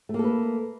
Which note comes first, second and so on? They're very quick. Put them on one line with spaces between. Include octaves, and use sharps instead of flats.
A3 A#3 A4 B4